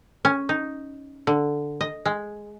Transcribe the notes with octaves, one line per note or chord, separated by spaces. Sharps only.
C#4
D#4
D3
D#5
G#3